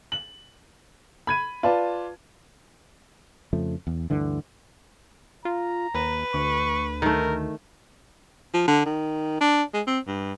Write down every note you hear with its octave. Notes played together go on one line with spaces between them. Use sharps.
F#7
B5 G#6 D#7
F4 B4 D5 A5
F2 C#3 F3 A3
E2
D2 G2 D3 E3
F4 A#5
D#2 B4
D2 C#6
D#3 A3 A#4
F3
D3
D#3
D4
G#3
C4
G2